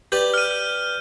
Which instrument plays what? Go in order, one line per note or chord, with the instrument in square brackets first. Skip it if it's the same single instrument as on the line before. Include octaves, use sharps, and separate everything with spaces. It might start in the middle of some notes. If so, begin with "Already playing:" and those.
[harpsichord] G4 B4 D5 [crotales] G6
[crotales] F6 D#7